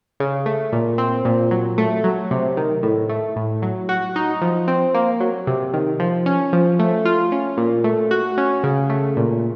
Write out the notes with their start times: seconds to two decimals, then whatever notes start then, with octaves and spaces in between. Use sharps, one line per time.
0.20 C#3
0.46 A3
0.72 A#2
0.98 C4
1.25 A#2
1.51 F#3
1.78 A3
2.04 F#3
2.31 C3
2.57 D#3
2.83 A2
3.09 A3
3.36 A2
3.62 F#3
3.89 F#4
4.16 D#4
4.42 F3
4.68 C4
4.94 A#3
5.20 F#3
5.47 C3
5.74 D#3
5.99 F3
6.26 C#4
6.53 F3
6.79 A3
7.05 F4
7.32 C#4
7.57 A#2
7.84 A3
8.11 F#4
8.38 C#4
8.64 C#3
8.90 A3
9.17 A#2